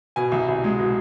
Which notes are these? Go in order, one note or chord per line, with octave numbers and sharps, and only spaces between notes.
B2 G#5
C2
C2
G#3
B2